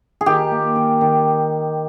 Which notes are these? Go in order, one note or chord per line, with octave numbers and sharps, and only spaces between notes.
G#4
D#3 G4
A#3
D#3
D#3